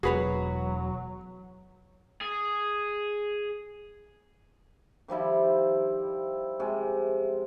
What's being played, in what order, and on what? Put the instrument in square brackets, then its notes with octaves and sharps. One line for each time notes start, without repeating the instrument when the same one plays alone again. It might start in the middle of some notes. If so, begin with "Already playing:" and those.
[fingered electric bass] E1 [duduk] F#3 [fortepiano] F#4 [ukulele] G#4 B4 C#5
[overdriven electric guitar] G#4
[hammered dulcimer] D#3 F3 G3 E4
C3 G#3